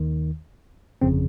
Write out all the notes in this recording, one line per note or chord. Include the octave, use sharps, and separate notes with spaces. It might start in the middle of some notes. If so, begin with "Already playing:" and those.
Already playing: D#2 D#3
G1 F2 C#3 C4